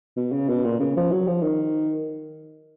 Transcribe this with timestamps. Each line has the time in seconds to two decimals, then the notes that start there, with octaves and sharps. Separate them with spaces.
0.16 B2
0.32 C#3
0.49 B2
0.65 A#2
0.79 C#3
0.96 F3
1.12 F#3
1.27 F3
1.43 D#3